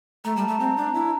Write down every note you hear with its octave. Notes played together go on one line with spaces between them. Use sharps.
A3 A#5
G3 A5
A3 A5
C4 A#5
D4
E4 A#5